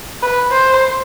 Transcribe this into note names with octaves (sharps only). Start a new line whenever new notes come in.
B4
C5